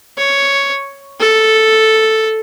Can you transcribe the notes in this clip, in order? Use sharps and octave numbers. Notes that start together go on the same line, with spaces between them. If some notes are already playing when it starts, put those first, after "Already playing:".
C#5
A4